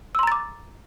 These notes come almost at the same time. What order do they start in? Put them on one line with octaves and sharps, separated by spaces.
E6 C6 A#5 A6 D6